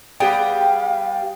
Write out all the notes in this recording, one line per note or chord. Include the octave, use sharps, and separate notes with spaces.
G3 B3 G4 G#4 F5 G5